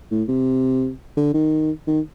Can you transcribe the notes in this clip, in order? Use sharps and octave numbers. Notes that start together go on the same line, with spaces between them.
A2
C3
D3
D#3
D#3